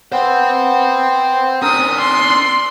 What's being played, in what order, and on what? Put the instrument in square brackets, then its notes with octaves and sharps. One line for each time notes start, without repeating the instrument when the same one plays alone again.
[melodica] B3 [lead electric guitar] C5 G5
[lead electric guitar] C#4 D4 [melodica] A#4 E6 [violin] D#6
[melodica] D5 E6 [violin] C6